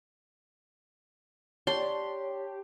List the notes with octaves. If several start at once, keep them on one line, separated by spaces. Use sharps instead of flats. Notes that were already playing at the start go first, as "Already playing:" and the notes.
D4 G4 C#5 A5 C6